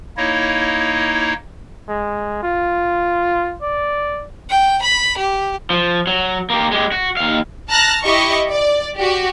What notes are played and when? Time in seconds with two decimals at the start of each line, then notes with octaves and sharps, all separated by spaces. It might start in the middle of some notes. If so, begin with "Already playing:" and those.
0.17 A#3 D#4 E4 C#5 D#5
1.89 G#3
2.43 F4
3.62 D5
4.50 G5
4.82 B5
5.17 G4
5.70 F3
6.07 F#3
6.50 A#3 G4
6.71 G#3 G4
6.92 F#4
7.17 D#2 F5
7.70 A5 A#5 F6 F#6 A#6
8.03 E4 G4 D#5 C#6
8.50 D5
8.97 F#4 G4